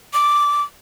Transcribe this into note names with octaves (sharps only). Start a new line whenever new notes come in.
D6